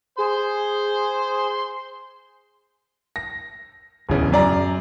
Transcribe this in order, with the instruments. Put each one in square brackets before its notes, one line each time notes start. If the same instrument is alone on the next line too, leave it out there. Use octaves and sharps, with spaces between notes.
[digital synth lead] G#4 [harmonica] C5 C6
[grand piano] A#6
D1 E2 C#3
F#2 D5 A#5